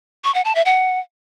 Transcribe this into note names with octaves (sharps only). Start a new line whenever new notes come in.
C#6
F#5
A5
E5
F#5